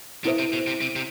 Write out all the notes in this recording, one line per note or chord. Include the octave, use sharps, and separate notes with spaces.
B2 E4 A4 C5 E5
C3
B2
C3
C3
C3